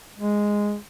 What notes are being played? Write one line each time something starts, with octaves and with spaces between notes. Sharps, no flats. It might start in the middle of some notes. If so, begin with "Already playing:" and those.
G#3